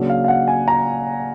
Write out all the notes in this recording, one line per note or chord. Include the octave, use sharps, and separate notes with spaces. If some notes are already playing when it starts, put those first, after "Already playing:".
Already playing: C#3 F#3 A#3 D4
F5
F5
F#5
G#5
A#5